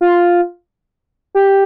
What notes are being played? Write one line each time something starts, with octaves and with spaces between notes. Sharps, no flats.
F4
G4